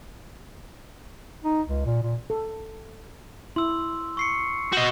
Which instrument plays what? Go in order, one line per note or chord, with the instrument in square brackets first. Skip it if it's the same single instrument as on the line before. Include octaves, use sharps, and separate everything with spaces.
[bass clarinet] D#4
C#2
A#2
A#2
[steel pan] A4
[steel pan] E4 [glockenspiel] C6 E6
[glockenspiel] C#6 C7 C#7
[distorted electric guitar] F#4 D#5 [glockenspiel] G6 E7